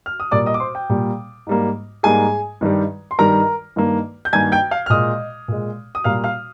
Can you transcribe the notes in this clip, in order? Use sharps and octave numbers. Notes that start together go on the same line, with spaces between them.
F6
D#6
A#2 G3 A#3 D5 D6
D#5 D#6
D6
C5 C6
G5
A#2 G3 A#3
G#2 G3 A#3
G#2 G3 A#3 G#4 G#5
G2 D#3 G3
C6
G2 D#3 G3 A#4 A#5
G2 D#3 A#3
G6
G2 D#3 A#3 G#5 G#6
G5 G6
F5 F6
F6
A#2 G#3 D#5 D#6
A#2 G#3
D#6
A#2 G3 A#3 F5 F6
F5 F6